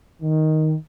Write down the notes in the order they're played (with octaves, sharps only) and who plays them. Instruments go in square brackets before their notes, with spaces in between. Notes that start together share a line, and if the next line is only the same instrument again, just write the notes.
[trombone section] D#3